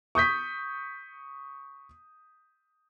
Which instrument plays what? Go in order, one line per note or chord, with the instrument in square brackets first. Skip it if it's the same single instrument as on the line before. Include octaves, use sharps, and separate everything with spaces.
[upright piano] C#6 D#6 G6 B6